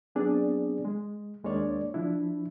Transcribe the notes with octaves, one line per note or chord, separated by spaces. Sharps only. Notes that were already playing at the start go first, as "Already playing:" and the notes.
F#3 B3 C4 D4 G#4 D5
G#3
D#2 G#3 A#3 D4 C#5 D5
F3 D4 E4